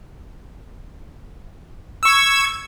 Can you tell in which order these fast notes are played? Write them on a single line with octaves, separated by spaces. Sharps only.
E6 C#6 G#6